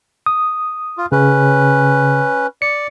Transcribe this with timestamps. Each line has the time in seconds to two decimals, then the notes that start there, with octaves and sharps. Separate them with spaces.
0.26 D#6
0.97 F4
1.12 C#3 C#4 B4
2.62 D5 C#7